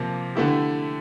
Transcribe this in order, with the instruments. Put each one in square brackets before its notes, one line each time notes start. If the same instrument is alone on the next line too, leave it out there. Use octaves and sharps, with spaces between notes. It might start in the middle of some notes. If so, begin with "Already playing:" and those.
Already playing: [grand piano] C3 F3 A#3
D3 A3 E4 G4